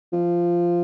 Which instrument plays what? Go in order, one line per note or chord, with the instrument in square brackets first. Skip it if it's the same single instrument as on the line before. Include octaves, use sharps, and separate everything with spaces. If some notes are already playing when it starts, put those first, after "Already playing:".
[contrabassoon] F3